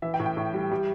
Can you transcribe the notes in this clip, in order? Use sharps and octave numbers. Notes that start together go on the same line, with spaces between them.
E3 E5
G5
A2
G5
A2
G3
G3